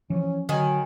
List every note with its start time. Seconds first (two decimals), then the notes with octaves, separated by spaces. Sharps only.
0.10 E3 F3 C#4
0.49 D3 D#3 F#3 G#5